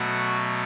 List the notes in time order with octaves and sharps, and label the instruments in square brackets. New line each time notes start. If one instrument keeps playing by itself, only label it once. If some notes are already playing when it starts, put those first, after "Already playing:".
Already playing: [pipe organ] B2 F#3 A3 F#4